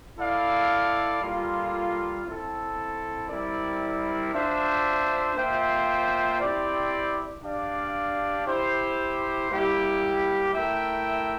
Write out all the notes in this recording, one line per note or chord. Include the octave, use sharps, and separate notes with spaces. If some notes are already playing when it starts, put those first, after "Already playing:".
E4 A4 D5 F5
G3 A#3 F4 A4
C4 E4 A4
G3 C4 E4 A#4 D5
D4 F4 C5 E5
A#3 F4 C5 E5 G5
C4 E4 G4 D5
D4 G4 D5 F5
E4 G4 C5
G3 A#3 E4 G4
A3 E4 A#4 E5 G5